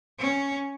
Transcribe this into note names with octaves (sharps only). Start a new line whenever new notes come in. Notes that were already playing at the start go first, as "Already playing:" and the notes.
C#4